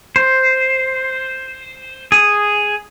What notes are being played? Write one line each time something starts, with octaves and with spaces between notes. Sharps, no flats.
C5
G#4